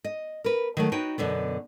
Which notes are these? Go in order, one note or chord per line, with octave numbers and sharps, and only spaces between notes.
D#5
A#4 B4
D#3 F#3 A3
D#4 F#4 B4 C#5 G5
F#2 B2 D3 B3